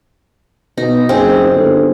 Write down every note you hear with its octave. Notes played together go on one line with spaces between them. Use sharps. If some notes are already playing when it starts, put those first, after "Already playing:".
B2 D#4
F#1 C4 G#4
G1